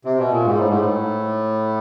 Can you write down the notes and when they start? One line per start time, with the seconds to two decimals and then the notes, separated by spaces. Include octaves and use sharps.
0.05 C3
0.18 B2
0.32 A#2
0.45 G#2
0.58 A2
0.69 G#2
0.80 A2